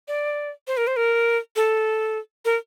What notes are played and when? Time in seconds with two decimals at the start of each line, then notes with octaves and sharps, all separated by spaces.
0.08 D5
0.67 C5
0.77 A#4
0.87 C5
0.97 A#4
1.56 A4
2.45 A#4